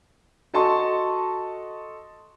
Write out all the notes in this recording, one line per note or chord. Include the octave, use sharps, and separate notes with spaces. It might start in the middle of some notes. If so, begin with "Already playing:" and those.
F#4 A4 D#5 A5 C6 C#6